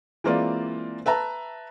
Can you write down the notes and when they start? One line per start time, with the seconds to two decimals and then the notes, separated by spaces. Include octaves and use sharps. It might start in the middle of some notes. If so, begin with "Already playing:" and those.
0.24 E3 G#3 A#3 C4 F4 D5
1.06 B4 E5 A5 A#5